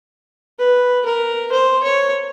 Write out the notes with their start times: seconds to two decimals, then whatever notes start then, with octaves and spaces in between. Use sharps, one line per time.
0.59 B4
1.06 A#4
1.52 C5
1.84 C#5